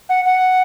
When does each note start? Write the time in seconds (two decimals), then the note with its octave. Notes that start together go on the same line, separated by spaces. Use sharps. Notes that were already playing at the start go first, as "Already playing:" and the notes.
0.09 F#5
0.25 F#5